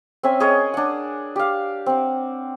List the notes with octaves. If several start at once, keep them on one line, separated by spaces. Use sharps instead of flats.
C4 C#4 E5 G#5
G#4 A#4 C#5 D#5
D4 F#5
G4 F5
C4 F#5